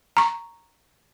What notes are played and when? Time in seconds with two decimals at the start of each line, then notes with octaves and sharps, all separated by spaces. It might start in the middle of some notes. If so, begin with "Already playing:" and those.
0.17 A#5 C#6